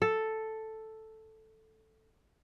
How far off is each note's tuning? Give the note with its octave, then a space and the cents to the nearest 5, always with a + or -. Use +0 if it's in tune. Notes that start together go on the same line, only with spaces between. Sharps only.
A4 +0